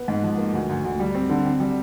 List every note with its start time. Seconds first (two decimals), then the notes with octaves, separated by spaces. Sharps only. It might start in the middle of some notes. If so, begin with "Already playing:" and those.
Already playing: B3
0.08 G#2
0.23 F3
0.38 A#3
0.53 D2
0.69 D2
0.84 D2
1.00 G3
1.15 C4
1.29 D3
1.45 C4
1.60 G3